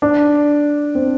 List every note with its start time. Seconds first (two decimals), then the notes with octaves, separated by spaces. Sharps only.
0.02 D4
0.95 C4